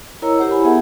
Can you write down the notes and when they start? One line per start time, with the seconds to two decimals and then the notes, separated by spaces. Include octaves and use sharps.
0.22 E4 A#4 C#5 D#5 A#5 E6
0.39 G4 C5 F#5
0.51 E4 G#5 B5
0.64 B3 G#4 E5 F#5